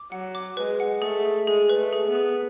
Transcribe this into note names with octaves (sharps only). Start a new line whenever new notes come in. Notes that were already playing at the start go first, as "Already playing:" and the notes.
Already playing: D6
F#3 F#5
D6
G#3 B4
F#5
A3 G#4
G#4
G#3 G#4
B4
A3
G#4
B3
G#4